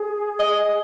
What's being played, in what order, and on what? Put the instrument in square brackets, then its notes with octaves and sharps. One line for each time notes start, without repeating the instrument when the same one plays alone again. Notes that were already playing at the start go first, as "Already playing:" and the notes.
Already playing: [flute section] G#4
[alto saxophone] D#5